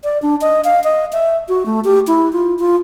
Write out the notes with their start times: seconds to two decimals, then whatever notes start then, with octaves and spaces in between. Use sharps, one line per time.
0.04 D5
0.22 D4
0.41 D#5
0.64 F5
0.84 D#5
1.13 E5
1.49 F#4
1.66 A3
1.84 G4
2.07 E4
2.33 F4
2.59 F4